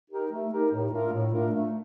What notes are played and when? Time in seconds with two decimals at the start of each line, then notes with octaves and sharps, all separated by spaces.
0.10 D#4 G4 A#4
0.31 A3
0.51 D#4 G4 A#4
0.72 A2
0.92 A3 D4 F4 A#4
1.12 A2
1.32 A3 D4 F4 A#4
1.53 A3